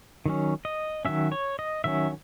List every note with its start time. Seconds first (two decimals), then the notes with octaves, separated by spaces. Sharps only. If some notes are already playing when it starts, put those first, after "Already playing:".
0.26 D#3 F#3 C#4
0.65 D#5
1.05 D#3 F#3 C#4 E5
1.32 C#5
1.59 D#5
1.84 D#3 F#3 C#4 E5